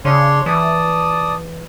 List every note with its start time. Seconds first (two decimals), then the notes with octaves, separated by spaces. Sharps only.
0.05 C#3 D4 C#5 C6
0.46 E3 D5 A5 D#6